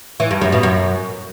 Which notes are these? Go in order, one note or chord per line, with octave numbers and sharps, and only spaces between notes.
E3
G2
F#2
B2
F#2